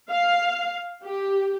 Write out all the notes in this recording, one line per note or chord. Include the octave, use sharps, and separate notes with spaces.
F5
G4